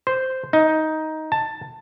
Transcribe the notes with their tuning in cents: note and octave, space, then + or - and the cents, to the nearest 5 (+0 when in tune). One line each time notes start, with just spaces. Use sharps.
C5 -5
D#4 +10
A5 +10